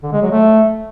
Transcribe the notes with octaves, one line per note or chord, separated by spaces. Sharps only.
D3
G#3
F#3
A3